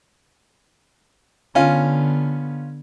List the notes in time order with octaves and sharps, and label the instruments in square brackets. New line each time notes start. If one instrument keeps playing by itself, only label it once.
[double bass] D3 B3 [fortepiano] C#4 F4